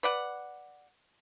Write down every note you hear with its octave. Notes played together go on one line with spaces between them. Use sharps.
B4 D5 F#5